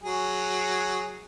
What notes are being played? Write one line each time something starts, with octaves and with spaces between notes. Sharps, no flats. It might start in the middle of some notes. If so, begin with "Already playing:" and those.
F#3 G#4